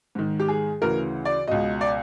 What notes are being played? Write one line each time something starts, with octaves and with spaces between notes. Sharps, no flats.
G#2 D#3
G4
G#4
D2 C#3 E3 A#4
D5
C#2 B2 D#5
D5